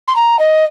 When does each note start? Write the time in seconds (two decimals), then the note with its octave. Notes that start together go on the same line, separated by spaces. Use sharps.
0.08 C6
0.16 A#5
0.39 D#5